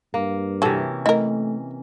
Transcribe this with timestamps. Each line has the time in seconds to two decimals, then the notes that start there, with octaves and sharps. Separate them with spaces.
0.14 G2 A#3
0.62 C3 E3 F#3 C#4 A4
1.06 A3 E4 A#4 D#5